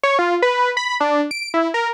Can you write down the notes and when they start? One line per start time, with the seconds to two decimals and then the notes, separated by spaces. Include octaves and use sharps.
0.03 C#5
0.19 F4
0.42 B4
0.77 B5
1.00 D4
1.31 D7
1.54 E4
1.74 A#4